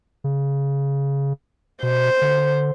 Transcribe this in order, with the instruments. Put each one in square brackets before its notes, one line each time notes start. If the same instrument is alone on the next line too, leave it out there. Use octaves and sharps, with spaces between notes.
[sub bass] C#3
[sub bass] B2 [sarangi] C5
[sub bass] D3